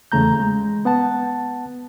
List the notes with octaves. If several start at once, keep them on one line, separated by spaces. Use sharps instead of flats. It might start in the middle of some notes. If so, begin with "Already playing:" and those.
E2 C#3 A3 A#5 G6
G#3
B3 F#5 A5